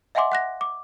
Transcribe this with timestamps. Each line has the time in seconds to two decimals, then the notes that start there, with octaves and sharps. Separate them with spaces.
0.15 D#5 E5 F#5 G#5 C6 D6
0.32 F#5 F#6 A#6
0.61 D6